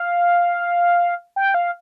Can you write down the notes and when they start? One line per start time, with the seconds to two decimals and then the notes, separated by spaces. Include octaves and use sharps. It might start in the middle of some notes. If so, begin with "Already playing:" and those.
Already playing: F5
1.36 G5
1.54 F5